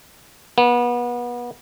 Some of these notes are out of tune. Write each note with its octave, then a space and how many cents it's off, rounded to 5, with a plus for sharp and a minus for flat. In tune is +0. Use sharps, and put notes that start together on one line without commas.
B3 -30